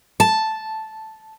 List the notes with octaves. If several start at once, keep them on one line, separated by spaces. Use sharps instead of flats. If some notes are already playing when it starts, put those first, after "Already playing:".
A5